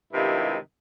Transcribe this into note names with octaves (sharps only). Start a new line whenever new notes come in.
G2 C3 D#3 G#3 E4 F4